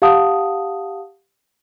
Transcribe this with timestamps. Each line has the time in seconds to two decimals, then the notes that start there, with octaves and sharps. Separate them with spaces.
0.02 G4 F5 F#5 A5 D#6